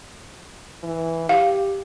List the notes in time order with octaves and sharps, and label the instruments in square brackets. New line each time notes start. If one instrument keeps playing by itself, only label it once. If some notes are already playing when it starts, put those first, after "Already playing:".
[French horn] E3
[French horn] G4 [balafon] F5